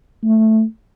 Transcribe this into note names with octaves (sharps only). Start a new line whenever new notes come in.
A3